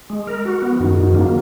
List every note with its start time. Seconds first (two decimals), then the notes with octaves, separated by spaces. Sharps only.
0.10 G#3
0.27 A#4
0.45 F#4
0.62 B3
0.72 F3
0.80 F#2 D#3 F#3
0.92 C#3
0.97 F#2 D#3
1.07 F3
1.15 D#3 F#3 A#3